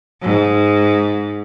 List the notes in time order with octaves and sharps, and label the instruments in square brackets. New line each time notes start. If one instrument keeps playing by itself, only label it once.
[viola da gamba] G#2